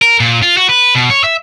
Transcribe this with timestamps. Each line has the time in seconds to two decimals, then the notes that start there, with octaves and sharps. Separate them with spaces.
0.02 A#4
0.20 A#2
0.43 F4
0.57 F#4
0.68 B4
0.95 B2
1.10 C#5
1.24 E5